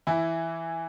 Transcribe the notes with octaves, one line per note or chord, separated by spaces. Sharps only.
E3 E4